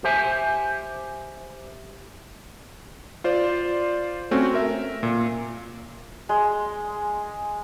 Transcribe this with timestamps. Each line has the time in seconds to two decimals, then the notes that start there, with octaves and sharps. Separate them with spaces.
0.04 G4 C5 E5 G#5
3.24 F4 C5 D5
4.31 A3 C4 C#4 F#4
4.54 A#4 E5
5.03 A#2
6.29 G#3